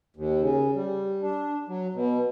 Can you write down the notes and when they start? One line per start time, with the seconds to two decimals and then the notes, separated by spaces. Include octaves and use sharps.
0.16 D#2
0.41 C#3
0.75 G3
1.22 D4
1.68 F#3
1.95 B2